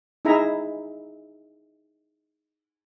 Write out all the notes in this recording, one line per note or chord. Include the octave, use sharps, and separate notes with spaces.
D#4 E4 G#4 E5 A#5